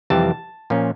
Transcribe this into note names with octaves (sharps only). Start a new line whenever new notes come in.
F2 C3 E3 G3 C4 A5
A#2 F3 A#3 C#4